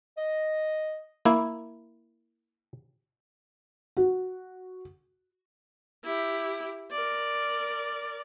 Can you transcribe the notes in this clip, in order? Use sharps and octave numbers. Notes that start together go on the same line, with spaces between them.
D#5
A#3 E4
F#4
E4 G4
A#4 D5